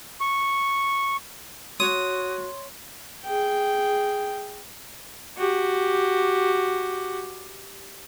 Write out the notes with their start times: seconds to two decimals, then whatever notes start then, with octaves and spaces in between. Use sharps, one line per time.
0.21 C#6
1.80 F#4 C#5 C6 D#6
3.24 G#4 G5
5.37 F#4 G4